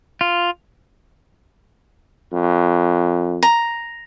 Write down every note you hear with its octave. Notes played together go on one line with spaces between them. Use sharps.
F4
F2
A#5